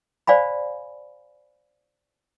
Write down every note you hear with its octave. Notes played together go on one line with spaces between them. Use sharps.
C5 D5 F5 G#5 B5